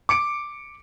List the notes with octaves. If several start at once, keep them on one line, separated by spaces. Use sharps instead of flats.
D6 C#7 D7